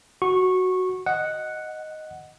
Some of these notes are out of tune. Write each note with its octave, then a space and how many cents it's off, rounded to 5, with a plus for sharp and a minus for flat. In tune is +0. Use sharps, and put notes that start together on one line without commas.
F#4 +0 C#6 -15
D#5 +0 F#5 +0